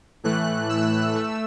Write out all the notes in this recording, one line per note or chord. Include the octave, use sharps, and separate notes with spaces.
A2 E3 A3 F#6
E6
A3